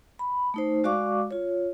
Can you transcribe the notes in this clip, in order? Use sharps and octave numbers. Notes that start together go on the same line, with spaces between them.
B5
A3 D#4 C5
G#3 F#4 D5 F5 C#6 D6
F4 C#5